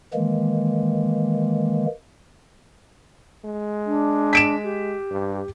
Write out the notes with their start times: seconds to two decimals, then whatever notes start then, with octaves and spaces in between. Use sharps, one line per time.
0.14 D#3 E3 G#3 A#3
3.45 G#3
3.85 D4
4.33 B6 D7 E7
4.63 G4
5.11 G2